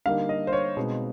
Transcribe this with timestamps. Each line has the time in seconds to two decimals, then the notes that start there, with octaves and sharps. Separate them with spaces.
0.06 D3 G3 A#3 D#4 F5
0.29 D#5
0.47 C5
0.53 C#5
0.77 B2 G#3 C4 D#4